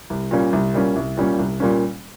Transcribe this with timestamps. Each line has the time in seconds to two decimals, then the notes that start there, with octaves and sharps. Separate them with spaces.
0.10 C2
0.31 A#2 G3 A#3 C#4
0.53 C2
0.74 A#2 G3 A#3 C#4
0.96 C2
1.17 A#2 G3 A#3 C#4
1.39 C2
1.60 A#2 G3 A#3 C#4